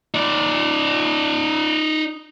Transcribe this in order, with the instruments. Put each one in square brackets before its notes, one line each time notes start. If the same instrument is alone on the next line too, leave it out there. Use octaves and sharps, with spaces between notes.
[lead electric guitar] D#4 D5